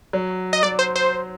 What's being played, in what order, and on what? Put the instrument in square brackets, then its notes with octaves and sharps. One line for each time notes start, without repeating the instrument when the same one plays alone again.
[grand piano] F#3
[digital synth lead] D#5
[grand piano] F#3 [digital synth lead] D5
[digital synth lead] C5
C5